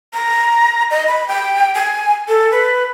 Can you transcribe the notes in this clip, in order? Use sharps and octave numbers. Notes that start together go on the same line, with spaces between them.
A#5
D#5
B5
G5
G#5
A4
B4